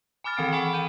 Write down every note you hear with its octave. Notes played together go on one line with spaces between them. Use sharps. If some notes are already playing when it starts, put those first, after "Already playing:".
G#5 B5 D6 F6 A6
D#3 E3 C4 G5 D7
F#5 G#5 B5 C#6
G6 D#7